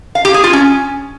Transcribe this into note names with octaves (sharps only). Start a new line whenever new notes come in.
F5
G4
G#4
F4
C#4